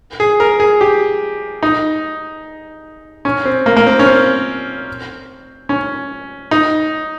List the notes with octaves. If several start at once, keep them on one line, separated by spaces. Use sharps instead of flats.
G#4
A#4
G#4
G4
D#4
C#4
C4
A#3
A#3
C4
C#4
C4
C#4
D#4